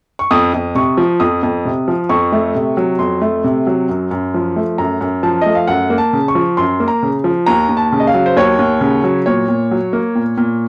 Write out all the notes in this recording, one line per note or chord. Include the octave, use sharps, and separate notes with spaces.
C#6
F2 D#6
F2
C3 C#6
F3
F2 D#6
F2
C3
F3
F2 C#6
A3
C3
F#3
F2 C6
A3
C3
F#3
F#2
F#2
F3
A3
F#2 A#5
F#2
F3 A5
A3 D#5
F5
F#2 F#5
A#3
A5
C#3
C#6
F3
F#2 C6
A#3
A#5
C#3
F3
D#2 A#5
D#2
A5
C#3
D#5
F5
F#3
C5
D#2 C#5
D#2
C#3
F#3
A#2 C#5
A#2
F#3
A#3
A#2
A#2